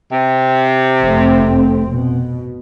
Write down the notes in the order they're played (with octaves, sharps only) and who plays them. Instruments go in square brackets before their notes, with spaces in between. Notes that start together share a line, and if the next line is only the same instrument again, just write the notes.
[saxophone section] C3
[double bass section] F1 A3 C4
B2